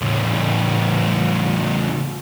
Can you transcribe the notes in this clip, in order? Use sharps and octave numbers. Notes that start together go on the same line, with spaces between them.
A2 C#3